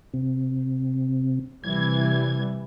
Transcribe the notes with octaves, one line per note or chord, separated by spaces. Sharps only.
C3
C3 E3 G3 G#6